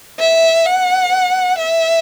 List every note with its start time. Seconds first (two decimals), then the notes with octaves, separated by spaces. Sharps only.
0.19 E5
0.66 F#5
1.59 E5